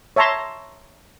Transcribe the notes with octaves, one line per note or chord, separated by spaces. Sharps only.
C#5 E5 A5 A#5 C6